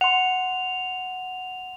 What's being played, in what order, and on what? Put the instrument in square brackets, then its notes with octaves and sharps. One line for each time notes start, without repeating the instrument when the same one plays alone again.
[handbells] F#5 C6 [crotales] F7